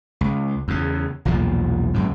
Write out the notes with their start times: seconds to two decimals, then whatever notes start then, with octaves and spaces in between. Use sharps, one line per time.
0.21 C#2
0.68 E2 C#3
1.25 B1 E2 A#2 F3
1.94 C#2 F#2 A2